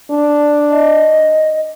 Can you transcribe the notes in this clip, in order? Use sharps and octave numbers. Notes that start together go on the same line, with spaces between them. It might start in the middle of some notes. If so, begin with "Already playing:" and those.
D4
D#5